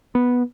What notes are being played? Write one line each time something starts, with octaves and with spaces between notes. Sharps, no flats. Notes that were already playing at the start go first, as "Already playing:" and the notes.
B3